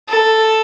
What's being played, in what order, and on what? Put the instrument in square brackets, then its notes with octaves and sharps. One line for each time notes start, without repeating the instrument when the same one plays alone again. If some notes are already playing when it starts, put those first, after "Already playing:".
[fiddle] A4